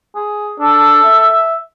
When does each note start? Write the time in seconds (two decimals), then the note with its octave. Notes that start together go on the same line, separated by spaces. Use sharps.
0.15 G#4
0.60 D4 A4
1.04 E5